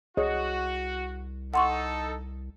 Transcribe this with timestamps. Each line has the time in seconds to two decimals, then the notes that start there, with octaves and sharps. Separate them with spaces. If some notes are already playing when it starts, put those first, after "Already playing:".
0.17 C2 F#4 G#4 C#5 D#5
1.54 D#4 A4 F#5 C6 C#6